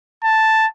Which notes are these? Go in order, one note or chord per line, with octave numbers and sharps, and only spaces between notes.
A5